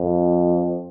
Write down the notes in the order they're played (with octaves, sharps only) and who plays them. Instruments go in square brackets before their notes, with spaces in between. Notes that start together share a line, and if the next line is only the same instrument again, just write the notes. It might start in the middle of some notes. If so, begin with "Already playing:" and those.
Already playing: [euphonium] F2